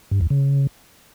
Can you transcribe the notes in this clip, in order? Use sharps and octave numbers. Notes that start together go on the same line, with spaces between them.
G2
E2
C#3